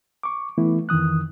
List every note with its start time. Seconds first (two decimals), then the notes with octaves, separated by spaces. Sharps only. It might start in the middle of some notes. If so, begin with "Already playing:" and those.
0.23 C#6 D6
0.58 E3 A3 B3 E4
0.89 F2 D#3 E3 D#6 F#6